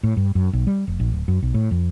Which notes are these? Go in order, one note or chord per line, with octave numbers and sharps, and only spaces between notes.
A2
G2
F#2
B1
G3
F1
A#1
D1
F#2
B1
A2
F2